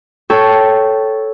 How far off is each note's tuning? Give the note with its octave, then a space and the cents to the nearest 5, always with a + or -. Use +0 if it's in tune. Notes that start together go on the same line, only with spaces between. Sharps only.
A4 -5 C#5 +0 G5 -10